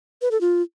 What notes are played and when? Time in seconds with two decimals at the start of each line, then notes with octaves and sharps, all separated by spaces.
0.22 B4
0.31 A4
0.41 F4